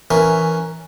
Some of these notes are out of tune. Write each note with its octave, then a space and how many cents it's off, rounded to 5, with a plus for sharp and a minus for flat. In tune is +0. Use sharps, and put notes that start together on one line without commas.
E3 +0 C#4 +0 A#4 +0